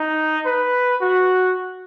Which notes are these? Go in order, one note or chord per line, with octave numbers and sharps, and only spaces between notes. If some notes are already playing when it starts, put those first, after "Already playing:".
Already playing: D#4
B4
F#4